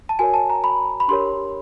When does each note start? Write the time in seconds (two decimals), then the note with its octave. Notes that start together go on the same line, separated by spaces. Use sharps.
0.09 A5
0.19 F#4 A#4 C#5 G#5
0.34 A5
0.50 A#5
0.64 B5
1.00 B5
1.08 D4 G4 A#4 C#5 C6